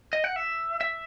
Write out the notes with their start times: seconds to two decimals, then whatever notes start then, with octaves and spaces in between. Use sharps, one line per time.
0.13 D#5
0.24 F#5
0.36 E5
0.81 E5